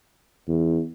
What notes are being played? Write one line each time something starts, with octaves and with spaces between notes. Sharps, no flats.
E2